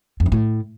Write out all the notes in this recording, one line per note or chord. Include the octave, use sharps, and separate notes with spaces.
F2
G2
A2